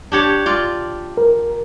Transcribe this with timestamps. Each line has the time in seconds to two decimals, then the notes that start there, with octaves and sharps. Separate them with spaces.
0.12 D4 G4 C#5
0.46 F4 D5
1.17 A#4